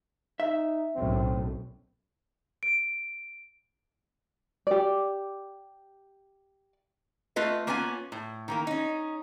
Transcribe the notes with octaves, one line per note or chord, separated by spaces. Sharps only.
D#4 E5
B1 F#2 A2 C4
D7
G4 D5
A3 F4 B4 D#5
A#3 B3 C#4 F4 G#5
A2
D#3 E3 A#3
C#4 D#4